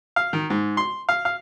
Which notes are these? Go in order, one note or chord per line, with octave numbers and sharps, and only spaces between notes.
F5
D#3
G#2
C6
F5
F5